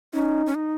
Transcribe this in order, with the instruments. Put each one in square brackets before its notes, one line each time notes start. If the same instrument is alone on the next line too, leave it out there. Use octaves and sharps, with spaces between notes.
[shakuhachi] C#4 [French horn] D#4
[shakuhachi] C#4
D#4